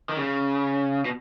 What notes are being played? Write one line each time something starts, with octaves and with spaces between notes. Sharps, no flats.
D#3
C#3
B2